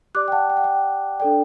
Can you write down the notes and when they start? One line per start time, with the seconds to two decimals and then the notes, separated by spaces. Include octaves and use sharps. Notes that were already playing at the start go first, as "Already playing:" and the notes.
0.15 G4 D5 D6 F#6
0.28 G5
0.32 F#5 A5
0.50 G5
0.57 F#5
0.64 G5
1.20 D4 A4 D5 G5